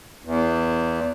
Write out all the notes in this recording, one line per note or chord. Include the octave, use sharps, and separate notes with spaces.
E2